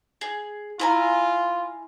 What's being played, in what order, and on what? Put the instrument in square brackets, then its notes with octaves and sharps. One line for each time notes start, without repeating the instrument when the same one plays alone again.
[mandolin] G#4
[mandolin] E4 G#5 A#5 [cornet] F4